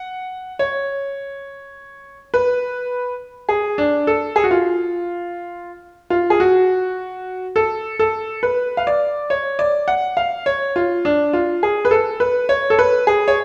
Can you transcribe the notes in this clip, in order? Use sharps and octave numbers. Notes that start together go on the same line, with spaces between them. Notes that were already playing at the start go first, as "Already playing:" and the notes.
Already playing: F#5
C#5
B4
G#4
D4
A4
G#4
F#4
F4
F4
G#4
F#4
A4
A4
B4
F5
D5
C#5
D5
F#5
F5
C#5
F4
D4
F4
G#4
B4
A4
B4
C#5
A4
B4
G#4
C#5